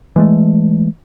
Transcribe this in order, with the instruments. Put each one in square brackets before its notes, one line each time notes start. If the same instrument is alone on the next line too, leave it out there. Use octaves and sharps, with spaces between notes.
[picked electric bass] E3 G#3 A3